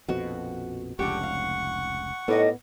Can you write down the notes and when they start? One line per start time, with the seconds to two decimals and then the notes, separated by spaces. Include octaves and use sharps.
0.08 A#1 F2 B2 F#4
0.99 F1 C#2 D3 G4 F#5 C#6
1.23 F5
2.28 A2 G3 B3 D#4 D#5